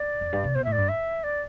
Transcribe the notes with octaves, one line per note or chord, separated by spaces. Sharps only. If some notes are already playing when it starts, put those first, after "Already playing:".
Already playing: D5
F2
G2
C3
B2 C5
A2 E5
D5
G2
E5
D5